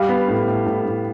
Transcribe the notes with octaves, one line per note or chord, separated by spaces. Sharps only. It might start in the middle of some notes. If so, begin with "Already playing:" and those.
Already playing: G3 F5
B3
A2
A2
A2
A2